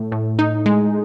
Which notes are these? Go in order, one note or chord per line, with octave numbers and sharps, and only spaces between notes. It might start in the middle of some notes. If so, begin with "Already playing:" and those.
Already playing: A2
A2
D#4
G#3